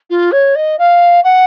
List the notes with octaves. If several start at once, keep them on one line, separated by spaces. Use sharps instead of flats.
F4
C#5
D#5
F5
F#5